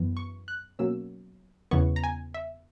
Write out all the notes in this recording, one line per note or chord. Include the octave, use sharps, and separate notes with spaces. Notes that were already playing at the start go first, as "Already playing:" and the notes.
Already playing: F#2 E3 B3
C#6
F#6
B2 F#3 A#3 C#4 E6
E2 C#3 E3 B3 C#6
A#5
G#5
E5